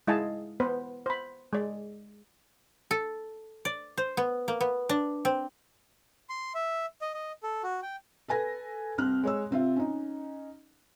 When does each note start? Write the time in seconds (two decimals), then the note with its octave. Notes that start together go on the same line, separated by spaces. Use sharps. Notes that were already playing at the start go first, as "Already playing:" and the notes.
0.07 G#3 E4 D#5 F5 G#5 A5
0.60 B3 B4 C5
1.06 C5 B5
1.53 G#3 D5
2.91 A4
3.65 D5
3.97 C5
4.17 B3
4.48 A#3
4.61 B3
4.89 D4
5.25 C4
6.29 C6
6.55 E5
7.01 D#5
7.14 D#5
7.43 A4
7.63 F#4
7.83 G5
8.28 A4 B4 G#5 A#6
8.98 C2 C4 F6 F#6
9.23 G#3 C#5 E6
9.51 C3 C4 F4 E5
9.76 C#4 D#4